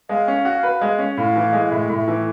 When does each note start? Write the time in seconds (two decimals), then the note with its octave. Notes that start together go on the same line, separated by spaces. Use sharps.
0.09 G#3 F5
0.28 C#4
0.45 F#4
0.63 B4
0.81 G#3
0.99 C#4
1.17 A2 F5
1.36 E3
1.53 G#3
1.66 F5
1.71 A2 E5
1.89 A2
1.98 E5
2.08 E3